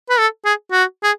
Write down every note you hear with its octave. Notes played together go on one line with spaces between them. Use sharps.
B4
A4
G#4
F#4
G#4